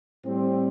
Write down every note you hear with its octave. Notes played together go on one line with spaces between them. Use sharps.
A2 G3 C4